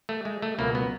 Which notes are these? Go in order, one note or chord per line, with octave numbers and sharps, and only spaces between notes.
A3
G#3
A3
C#2 B2 F#3 A#3
B3